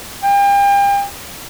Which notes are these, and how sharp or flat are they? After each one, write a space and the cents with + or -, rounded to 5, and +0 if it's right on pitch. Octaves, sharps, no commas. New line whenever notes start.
G5 +35